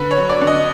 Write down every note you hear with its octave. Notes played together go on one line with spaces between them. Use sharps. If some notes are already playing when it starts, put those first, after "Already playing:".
Already playing: D3 B4
C#5
F#3
D5
D3
D#5